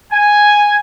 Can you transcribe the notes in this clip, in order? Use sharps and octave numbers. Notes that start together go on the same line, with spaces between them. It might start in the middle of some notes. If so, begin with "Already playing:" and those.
G#5